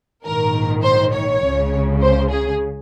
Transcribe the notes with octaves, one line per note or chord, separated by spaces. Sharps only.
A#1 G#2 D#3 A#4
C5
C#5
C#2 C#3
C5
G#4